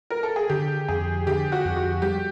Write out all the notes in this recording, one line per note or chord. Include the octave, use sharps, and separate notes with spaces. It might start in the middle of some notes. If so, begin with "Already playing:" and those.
A#4
A4
G#4
D3 G4
F2 G#4
D3 G4
F#4
F2
F#4
G3 G4